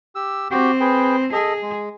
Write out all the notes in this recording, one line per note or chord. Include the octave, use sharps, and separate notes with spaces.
G4 E6
C4 F#4 G4 G5
G#4 B4 G5
G#4 A4 D#5
G#3